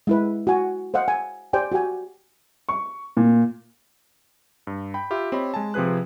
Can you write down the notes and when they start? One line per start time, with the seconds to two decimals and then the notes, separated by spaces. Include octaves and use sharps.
0.07 G#3 E4 B4
0.47 F#4 F#5 G#5
0.94 C5 D#5 F5 F#5
1.08 G#5
1.53 G4 C5 D5 G5 G#5
1.72 F#4 G4 G5 G#5
2.69 C#6
3.17 A#2
4.67 G2
4.94 G5 B5
5.11 F4 G4 E5 B5
5.32 C4 G4 C#5 D#5 B5
5.54 G#3 G#5 A5
5.74 C3 F3 C4 G#4 B4 F#6